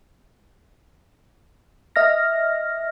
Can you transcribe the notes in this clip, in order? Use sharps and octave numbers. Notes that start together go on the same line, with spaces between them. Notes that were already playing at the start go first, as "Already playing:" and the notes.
D#5 E5 F6 A#6